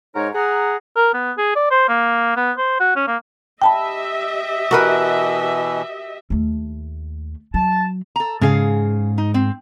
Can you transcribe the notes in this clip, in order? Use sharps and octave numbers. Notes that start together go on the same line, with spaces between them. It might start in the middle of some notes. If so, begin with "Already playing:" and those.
G#2 G#3 D#4 A#4 C#5
G#4 F#5 A#5
A#4
B3
G#4
D5
C5
A#3
B3
C5
F#4
C#4
A#3
G4 D#5 E5 G5 A5 B5
B2 E3 F#4 A#4 B4
D#2 A3
F#3 A5
A4 A#5
G#2 C#3 G#4 F5
D#4
C4